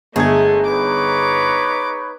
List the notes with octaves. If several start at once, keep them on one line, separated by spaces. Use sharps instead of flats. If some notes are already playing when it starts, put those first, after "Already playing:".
G1 G#3 A3 G#4 G#6
D#4 B4 C#5 D6